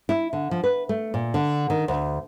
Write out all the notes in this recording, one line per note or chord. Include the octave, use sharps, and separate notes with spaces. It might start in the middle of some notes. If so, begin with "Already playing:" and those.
E4
D3
F3
B4
A3
A#2
D3
D#3
D2